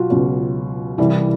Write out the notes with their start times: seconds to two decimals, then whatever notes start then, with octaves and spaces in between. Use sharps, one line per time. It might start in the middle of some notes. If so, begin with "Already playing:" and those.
Already playing: B2 F#3 F4 F#4
0.10 C#2 B2 F#3
0.98 C2 C3 E3 G3